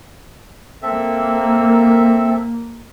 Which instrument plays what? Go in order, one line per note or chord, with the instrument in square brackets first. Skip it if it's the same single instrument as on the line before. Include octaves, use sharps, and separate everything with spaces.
[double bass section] A#3 [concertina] C4 A4 E5